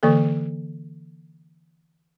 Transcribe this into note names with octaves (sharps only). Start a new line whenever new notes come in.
D3 E3 A#3 A4